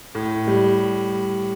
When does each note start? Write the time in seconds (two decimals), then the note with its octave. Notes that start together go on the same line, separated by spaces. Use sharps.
0.15 A2
0.47 G3